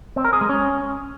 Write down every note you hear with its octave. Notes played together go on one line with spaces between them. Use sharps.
C4
A#4
G#4
G#3
C#4